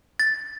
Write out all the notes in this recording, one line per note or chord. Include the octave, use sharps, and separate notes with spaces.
A6